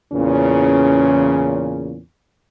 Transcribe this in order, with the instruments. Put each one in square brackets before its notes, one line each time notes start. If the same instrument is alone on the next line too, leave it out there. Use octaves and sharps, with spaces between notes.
[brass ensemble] E2 A#2 C#3 C#4